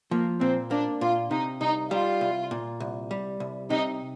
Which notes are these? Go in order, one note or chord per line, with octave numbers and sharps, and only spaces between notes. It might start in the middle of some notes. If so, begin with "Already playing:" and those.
F3 A#3
A#2 C4
A#3 D4
A#2 F4
C3 D#4
C2 D#4
G3 F4
C2
A#2
C2
G3
C2
C3 D#4